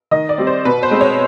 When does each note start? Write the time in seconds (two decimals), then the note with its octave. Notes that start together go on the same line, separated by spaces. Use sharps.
0.11 D#3 D#5
0.29 D5
0.38 G3 C4
0.47 C5
0.65 B2 B4
0.83 C5
0.91 G#3 C4
1.01 C#5